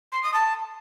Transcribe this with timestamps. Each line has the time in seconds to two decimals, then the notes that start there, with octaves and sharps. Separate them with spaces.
0.12 C6
0.23 D#6
0.33 A5